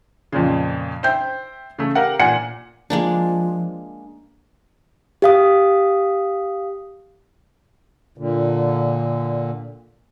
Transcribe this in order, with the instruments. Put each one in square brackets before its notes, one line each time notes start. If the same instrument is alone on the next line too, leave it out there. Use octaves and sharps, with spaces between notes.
[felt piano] F2 A#2 C#3
C5 E5 G5 G6
C#3 A3
G4 A#4 F5 F#5
A#2 F#5 G#5 C#7
[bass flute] F3 [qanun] G#3 A#3 D4
[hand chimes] G4 F5 D#6
[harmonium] A#2 D3